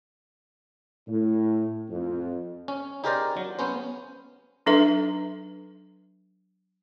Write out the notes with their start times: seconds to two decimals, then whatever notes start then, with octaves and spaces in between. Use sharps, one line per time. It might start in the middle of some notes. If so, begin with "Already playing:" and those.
1.08 A2
1.89 F2
2.68 C#4
3.04 D#4 G4 G#4 A#4 C5 D5
3.37 F#3
3.59 B3 C#4 C5
4.66 F#3 D4 D#4 A4 B4 E5